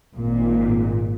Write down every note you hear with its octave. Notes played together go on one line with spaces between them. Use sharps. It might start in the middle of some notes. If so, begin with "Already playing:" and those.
G#1 A#2